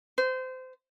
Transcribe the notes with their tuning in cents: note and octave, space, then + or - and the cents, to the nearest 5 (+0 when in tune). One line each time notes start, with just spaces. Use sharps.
C5 -25